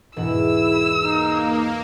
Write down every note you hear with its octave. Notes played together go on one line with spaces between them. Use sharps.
E1 G#2 E4 F#5 E6
A#3 D#4